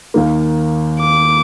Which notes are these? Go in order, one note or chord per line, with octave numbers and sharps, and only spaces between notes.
D#2 D#3 A#3
D6